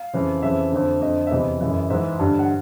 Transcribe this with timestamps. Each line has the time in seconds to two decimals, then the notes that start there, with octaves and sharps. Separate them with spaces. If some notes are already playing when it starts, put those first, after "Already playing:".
Already playing: F5
0.14 F2 C#3 E3
0.43 F2 C#3 E3 E5
0.72 F2 D3
1.01 F2 D3 D#5
1.27 E5
1.31 E2 C3 E3 D#5
1.60 F#2 C#3 E3
1.90 G#2 E3 E5
2.19 G2 D3
2.39 F#5